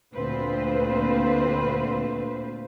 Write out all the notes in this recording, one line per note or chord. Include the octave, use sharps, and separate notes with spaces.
D2 A#2 C4 F4 B4 C5